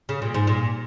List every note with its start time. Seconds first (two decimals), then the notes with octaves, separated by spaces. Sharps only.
0.09 C#3
0.22 A#2
0.34 G#2
0.47 A#2